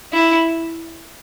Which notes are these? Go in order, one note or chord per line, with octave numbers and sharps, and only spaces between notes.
E4